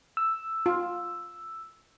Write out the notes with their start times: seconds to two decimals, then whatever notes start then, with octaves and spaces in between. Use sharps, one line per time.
0.17 E6
0.66 F4